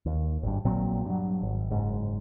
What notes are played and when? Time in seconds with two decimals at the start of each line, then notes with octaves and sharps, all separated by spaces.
0.06 D#2
0.43 G#1 G2
0.65 A#1 A#2 F#3 C4
1.06 G2 F#3
1.42 G#1
1.70 F#1 G#2